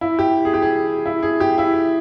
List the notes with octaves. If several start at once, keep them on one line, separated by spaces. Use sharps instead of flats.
E4
G4
G#4
G4
G#4
E4
G#4
G4
E4